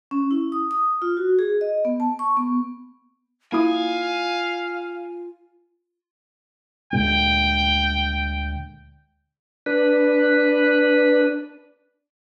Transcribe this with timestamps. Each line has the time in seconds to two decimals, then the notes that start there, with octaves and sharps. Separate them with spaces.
0.11 C#4
0.31 E4
0.52 D#6
0.71 D#6
1.02 F4
1.17 F#4
1.39 G#4
1.61 D#5
1.85 B3
2.00 A5
2.19 C#6
2.37 B3
3.52 A#3 E4 F4 F5 G#5 D#6
6.93 D2 A#2 G#3 G5
9.66 D4 B4